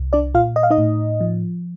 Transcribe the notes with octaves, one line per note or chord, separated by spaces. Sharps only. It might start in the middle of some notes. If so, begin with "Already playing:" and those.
Already playing: C2
D4 D5
A#2 F4 F5
D#5
F5
D#4 D#5
A2
F3